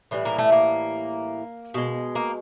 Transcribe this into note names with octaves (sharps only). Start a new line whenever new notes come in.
A2 E3 G3
A#3
A3
A#3
B2 G#3
A#3